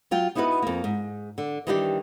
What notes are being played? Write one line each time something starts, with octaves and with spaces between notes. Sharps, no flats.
F#3 F4 G5
B3 D#4 E4 F#4 G#4 B4
F2 A#3
G#2
D3
D#3 E3 G3 D4 E4 G4